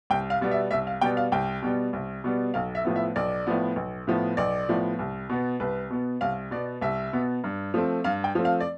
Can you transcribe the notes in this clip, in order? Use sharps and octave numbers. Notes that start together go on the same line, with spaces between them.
C2 G5
F5
B2 G3 B3
E5
C2 E5
F5
B2 G3 B3 G5
F5
C2 G5
B2 G3 B3
C2
B2 G3 B3
B1 F5
E5
A2 F3 B3
E5
B1 D5
A2 F3 B3
B1
A2 F3 B3
B1 D5
A2 F3 B3
C2
B2 B3
C2 B4
B2 B3
C2 F5
B2 B3 D5
C2 E5
B2 B3
G2
F3 A3 C4
G2 F5
G5
F3 A3 C4
F5
D5